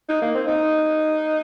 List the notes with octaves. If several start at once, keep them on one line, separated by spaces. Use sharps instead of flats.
D#4
A#3
C4
D#4